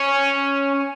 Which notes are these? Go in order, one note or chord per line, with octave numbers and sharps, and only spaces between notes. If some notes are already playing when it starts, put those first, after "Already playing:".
Already playing: C#4